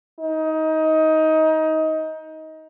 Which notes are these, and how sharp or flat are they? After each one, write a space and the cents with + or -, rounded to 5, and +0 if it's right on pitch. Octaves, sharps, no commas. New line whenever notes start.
D#4 +20